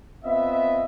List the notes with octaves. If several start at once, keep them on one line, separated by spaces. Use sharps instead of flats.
B3 C4 F4 D#5 E5